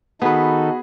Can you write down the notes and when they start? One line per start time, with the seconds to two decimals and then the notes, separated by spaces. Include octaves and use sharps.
0.22 D#3 B3 D#4 F#4 G#4 A4 B4 B5